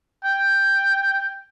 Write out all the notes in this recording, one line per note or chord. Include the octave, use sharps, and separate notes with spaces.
G5